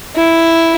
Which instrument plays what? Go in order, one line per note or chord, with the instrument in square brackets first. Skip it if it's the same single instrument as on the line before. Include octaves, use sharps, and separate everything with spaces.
[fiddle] E4